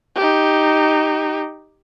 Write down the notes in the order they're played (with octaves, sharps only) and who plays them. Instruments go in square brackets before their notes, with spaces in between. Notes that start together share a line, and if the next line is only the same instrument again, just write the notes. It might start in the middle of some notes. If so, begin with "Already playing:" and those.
[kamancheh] D#4 G4